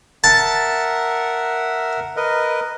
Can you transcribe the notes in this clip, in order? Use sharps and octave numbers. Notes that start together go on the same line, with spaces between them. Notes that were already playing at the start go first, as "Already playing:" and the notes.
A#4 E5 F#5 A5
A#4 B4 D#5